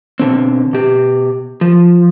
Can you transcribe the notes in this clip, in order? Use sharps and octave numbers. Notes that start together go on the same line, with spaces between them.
B2 D3 C4
B2 G4
F3